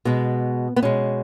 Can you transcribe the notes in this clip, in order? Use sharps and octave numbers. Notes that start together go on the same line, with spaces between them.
B2 G#3 B3
B3
B2 G#3 C#4